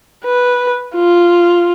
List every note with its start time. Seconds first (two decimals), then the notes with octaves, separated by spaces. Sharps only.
0.25 B4
0.95 F4